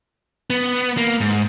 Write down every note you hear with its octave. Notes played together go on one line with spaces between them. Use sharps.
B3
A#3
G#2